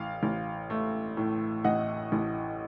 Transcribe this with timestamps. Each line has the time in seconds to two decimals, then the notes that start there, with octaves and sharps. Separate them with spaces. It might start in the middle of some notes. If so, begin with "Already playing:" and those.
Already playing: A1 F5
0.23 A1
0.70 A3
1.17 A2
1.64 A1 D#5 F#5
2.12 A1